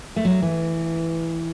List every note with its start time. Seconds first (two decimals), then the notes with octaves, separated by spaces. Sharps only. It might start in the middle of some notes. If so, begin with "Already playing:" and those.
0.16 A3
0.25 F#3
0.42 E3